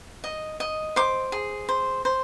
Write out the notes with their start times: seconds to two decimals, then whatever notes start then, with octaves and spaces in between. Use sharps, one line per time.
0.24 D#5
0.60 D#5
0.96 C5 D6
1.32 G#4
1.69 C5
2.05 C5